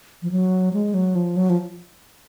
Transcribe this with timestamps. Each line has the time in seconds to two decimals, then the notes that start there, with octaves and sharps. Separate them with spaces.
0.22 F3
0.31 F#3
0.73 G#3
0.94 F#3
1.15 F3
1.37 F#3
1.50 F3